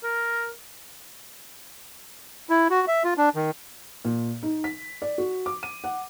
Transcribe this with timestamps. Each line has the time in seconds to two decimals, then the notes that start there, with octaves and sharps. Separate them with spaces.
0.03 A#4
2.50 E4
2.70 F#4
2.88 E5
3.04 F4
3.18 D4
3.35 D#3
4.05 A#2
4.43 D#4
4.64 B6
5.02 D5
5.18 F#4
5.46 D6
5.63 D#7
5.84 F#5